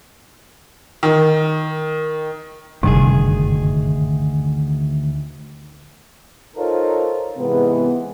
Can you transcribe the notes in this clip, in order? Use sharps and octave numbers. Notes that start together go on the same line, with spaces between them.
D#3
F#1 D2 G2 C3 D#3 G#4
D#4 F4 A4 A#4 C5 C#5
G#2 C3 E3 G#3 B3